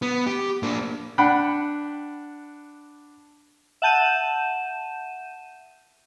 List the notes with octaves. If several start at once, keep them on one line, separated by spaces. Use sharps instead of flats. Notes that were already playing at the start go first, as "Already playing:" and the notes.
B3
G4
A#3 D4
D4 F#5 G5 B5
E5 F#5 A5 G6 D#7 E7